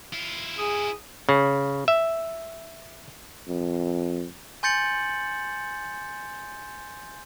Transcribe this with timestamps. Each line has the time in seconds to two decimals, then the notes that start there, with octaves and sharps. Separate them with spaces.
0.13 E4 F4
0.58 G#4 D#6
1.29 C#3
1.88 E5
3.47 F2
4.63 G#5 C6 G6 A6 C#7 F#7